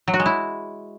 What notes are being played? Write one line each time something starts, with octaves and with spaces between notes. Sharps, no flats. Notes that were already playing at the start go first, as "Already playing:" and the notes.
F#3
F#4
G#3
E4